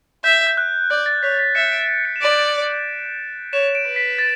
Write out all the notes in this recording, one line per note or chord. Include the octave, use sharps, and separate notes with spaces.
E5 G6
G6
F#6
D5 G6
A6
C#5 B6
B6
E5 C#7
D7
C#7
E7
D5 D7
C#5 E7
D7
B4
B6
A6